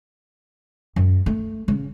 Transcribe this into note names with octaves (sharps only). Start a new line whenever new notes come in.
F#2
A3
C#3